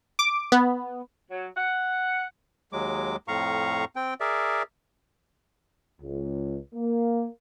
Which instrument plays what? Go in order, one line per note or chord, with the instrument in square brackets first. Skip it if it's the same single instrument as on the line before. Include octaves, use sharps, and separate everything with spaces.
[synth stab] D6
B3
[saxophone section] F#3
F#5
[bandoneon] D#2 F#3 G#3 D6
F2 A2 F5 A#5 C#6
C4 G5
G#4 A#4 D5 E5
[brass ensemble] C#2
A#3